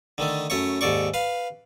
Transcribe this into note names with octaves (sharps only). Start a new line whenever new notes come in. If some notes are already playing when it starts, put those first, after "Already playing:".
D3 D#3 A3
F#2 A3 C#5 C#6
D#2 G#2 A4 D5 C#6
B4 F5